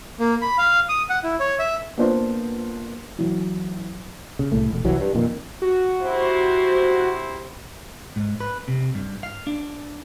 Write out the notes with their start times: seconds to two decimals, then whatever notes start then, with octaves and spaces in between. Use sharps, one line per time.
0.19 A#3
0.42 B5
0.58 F5
0.89 D#6
1.10 F#5
1.23 E4
1.40 C#5
1.59 E5
1.98 A#3 B3 D4 F4 C5
3.19 E3 F#3
4.39 C#3
4.52 C2 A2 A3
4.71 E1
4.84 C2 E3 F#3
5.00 G2
5.15 F2 A#2 D#3
5.62 F#4
6.02 C3 E4 C5
8.16 G#2
8.41 B4
8.68 C3
8.95 G2
9.23 F5
9.47 D4